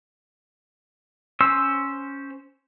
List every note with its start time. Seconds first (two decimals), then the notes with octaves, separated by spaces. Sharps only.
1.40 C#4 C5 C6 E6